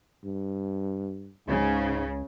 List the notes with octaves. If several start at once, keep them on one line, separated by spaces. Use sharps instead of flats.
G2
C#2 G#2 C#3